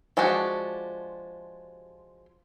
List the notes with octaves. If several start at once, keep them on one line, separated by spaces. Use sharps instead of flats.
F3 G#3 D4 F#4 G4